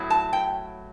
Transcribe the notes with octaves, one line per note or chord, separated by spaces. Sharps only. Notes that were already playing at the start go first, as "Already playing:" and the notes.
Already playing: A2 F#3 B3 E4
A5
G5